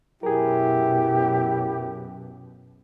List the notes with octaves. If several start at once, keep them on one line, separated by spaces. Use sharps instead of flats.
F#2 B2 F#3 E4 G4 G#4 A#4